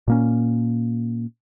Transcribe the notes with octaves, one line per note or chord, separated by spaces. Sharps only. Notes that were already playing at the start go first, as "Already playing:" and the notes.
A#2 A#3 C#4